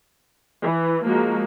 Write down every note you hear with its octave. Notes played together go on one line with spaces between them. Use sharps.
E3
F3 G#3 A#3 F#4